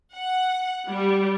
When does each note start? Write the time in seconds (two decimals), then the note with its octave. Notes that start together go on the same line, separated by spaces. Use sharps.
0.15 F#5
0.89 G3